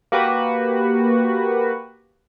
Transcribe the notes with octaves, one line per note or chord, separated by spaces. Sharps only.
A#3 F#4 G4 B4